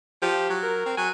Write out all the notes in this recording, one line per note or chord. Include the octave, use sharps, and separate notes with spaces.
F3 G4
F#3
A#4
C4
F#3 G#5